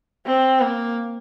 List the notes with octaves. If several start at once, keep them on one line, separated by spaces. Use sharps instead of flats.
C4
A#3